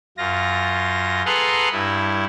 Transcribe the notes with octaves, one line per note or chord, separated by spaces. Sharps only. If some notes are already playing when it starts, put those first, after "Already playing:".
F#2 F4 A#6
G#4 A4 B4 F#5 A#5 C6
G2 E4